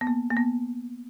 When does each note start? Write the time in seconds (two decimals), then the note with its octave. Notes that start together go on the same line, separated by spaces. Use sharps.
0.01 B3
0.07 A#3
0.30 A#3
0.37 B3